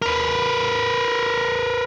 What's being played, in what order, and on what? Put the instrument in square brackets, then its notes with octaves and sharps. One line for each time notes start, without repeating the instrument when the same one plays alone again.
[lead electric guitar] A#4 B4